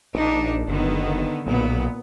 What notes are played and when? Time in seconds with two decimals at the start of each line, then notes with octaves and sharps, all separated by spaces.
0.15 A#1 D4 D#4
0.68 F#1 D3 D#3 B3
1.47 B1 A#2 B3